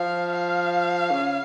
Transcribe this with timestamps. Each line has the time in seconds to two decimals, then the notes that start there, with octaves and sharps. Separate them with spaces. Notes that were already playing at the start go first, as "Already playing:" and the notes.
Already playing: F3 F5
0.32 F5
1.11 C#3